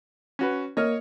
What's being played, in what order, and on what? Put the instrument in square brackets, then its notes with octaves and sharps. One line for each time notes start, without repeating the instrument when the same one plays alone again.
[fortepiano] C#4 F#4 B4
[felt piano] A#3 [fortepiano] C#5 D#5 F6